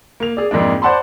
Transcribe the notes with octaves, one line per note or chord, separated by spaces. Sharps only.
A#3 F7
G#4 D5
F2 G#2 G#3 A#3 D4
C5 D5 F#5 A5 B5 C6